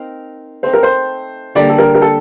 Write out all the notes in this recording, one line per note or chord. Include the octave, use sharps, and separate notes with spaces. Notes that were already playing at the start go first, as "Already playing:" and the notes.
Already playing: C4 D#4 A#4 F5
A3 C4 D#4 C5
A#4
C5
D3 G3 A#3 D5
A4
A#4
A#4
A4